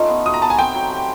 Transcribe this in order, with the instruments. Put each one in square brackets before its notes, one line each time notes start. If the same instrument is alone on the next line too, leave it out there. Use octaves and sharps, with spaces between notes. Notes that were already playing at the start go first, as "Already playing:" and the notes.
Already playing: [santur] A3 C#4 D#4 F4
B3
[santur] F#4 [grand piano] D#6
[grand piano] A#5
[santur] B3 [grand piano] A5
[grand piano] G#5
[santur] C4 [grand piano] G5
[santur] F#3
G4